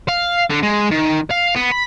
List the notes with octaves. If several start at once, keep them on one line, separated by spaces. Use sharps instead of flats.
F5
D3
G#3
D#3
F5
B3
B5